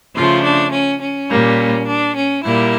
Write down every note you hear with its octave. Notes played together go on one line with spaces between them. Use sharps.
C#3 F3 A3 F4
D4
C#4
C#4
A#2 G3 A#3
D4
C#4
A#2 G3 A#3 E4